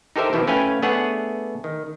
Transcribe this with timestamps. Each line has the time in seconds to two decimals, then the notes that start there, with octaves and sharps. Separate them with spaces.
0.16 D#4 G4 A4 A#4 C5 E5
0.33 B2 E3 F3 E4 G4
0.47 A3 C#4 B4 F5 G5 G#5
0.82 A3 B3 D4 G#4 C#5 F#5
1.64 D#3